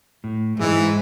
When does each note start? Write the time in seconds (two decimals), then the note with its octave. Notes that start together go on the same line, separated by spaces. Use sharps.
0.24 A2
0.59 G#2 E3 G#3